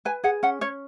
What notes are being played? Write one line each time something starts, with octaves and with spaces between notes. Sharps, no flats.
B4 G#5
G#4 F#5
C#4 F#5
C#4 C#5